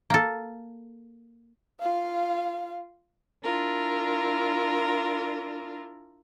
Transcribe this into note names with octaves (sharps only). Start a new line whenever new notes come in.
A#3 A4
F4 F5
D4 E4 F4 A#4